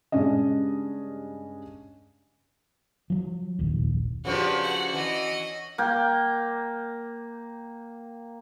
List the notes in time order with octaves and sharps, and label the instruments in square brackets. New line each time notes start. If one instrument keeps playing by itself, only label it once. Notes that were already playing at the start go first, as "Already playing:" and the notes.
[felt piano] G2 C#3 G#3 C#4 D4 D#5
[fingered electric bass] F3 F#3
F1 A#1 D#2
[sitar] C#3 F3 D4 [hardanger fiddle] F#4 [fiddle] G4 B4
[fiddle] F#5
[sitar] E3 [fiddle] D#5
[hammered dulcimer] A#3 G5